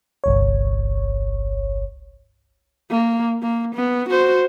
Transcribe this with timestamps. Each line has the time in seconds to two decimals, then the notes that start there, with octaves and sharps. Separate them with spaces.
0.24 G1 C2 C#5
2.90 A#3
3.43 A#3
3.75 B3
4.09 F#4 C5